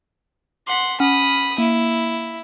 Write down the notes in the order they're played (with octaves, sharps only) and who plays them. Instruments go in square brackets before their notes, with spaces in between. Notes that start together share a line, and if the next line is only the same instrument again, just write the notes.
[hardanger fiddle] F#5 C6 [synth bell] D6 B6
[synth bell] C#4 F#5 F6 [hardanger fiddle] B5 D#6
[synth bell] A#3 [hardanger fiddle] E4